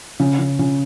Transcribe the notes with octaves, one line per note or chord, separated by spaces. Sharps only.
C#3
C#3
C#3